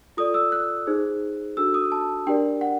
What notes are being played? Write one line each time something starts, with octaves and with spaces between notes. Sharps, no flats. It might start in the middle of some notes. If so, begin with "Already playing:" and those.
F4 A4 D5 D#6
E6
F#6
D#4 G#4 C5
D4 F#4 A4 E6
D#6
A5
D4 G4 A#4 D5 G5
F#5